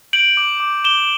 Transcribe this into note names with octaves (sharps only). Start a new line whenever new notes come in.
G6 D7 F#7
D6
D6
D6 E7 G7